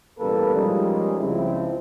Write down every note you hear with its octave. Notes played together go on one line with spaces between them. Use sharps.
A1 B2 G3 A#3 A4 B4
F3 G3 G#3 A#3 C#4 D#4
C#2 C#3 F3 C4 E4